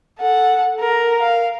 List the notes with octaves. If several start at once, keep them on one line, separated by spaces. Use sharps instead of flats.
A4 F#5
A#4
F5